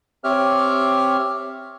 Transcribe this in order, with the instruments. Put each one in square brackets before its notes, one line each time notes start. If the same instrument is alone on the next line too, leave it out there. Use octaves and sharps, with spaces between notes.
[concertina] C4 G4 C#5 E5 F6